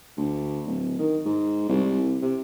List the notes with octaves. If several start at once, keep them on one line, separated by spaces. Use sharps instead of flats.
D2
D1
D#3
G#2
C2
C3